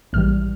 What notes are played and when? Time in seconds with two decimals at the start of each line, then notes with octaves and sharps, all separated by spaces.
0.13 A#1 G#2 E3 G3 F6